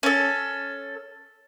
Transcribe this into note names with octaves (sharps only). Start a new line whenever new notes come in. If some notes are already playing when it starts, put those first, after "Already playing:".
C#4 A4